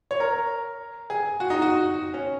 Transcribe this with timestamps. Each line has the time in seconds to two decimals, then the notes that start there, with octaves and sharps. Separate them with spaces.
0.11 C#5
0.20 A#4
1.10 G#4
1.40 F#4
1.50 D#4
1.62 F#4
2.14 C#4